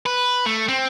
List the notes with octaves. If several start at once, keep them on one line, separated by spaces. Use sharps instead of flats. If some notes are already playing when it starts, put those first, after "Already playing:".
B4
A3
C4